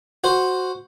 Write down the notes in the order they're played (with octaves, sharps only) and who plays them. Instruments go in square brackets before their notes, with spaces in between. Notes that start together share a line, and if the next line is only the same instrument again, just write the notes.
[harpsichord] F#4 C5